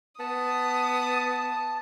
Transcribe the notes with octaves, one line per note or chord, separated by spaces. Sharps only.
B3 A5 D#6